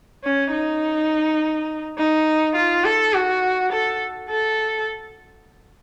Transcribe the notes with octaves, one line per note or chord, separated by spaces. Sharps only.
C#4
D#4
D#4
F4
A4
F#4
A4
A4